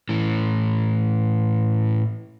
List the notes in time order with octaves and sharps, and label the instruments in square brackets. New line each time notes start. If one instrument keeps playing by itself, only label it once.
[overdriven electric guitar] A2 E3